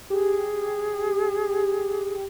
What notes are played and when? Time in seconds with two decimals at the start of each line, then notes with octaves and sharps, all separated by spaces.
0.10 G4 G#4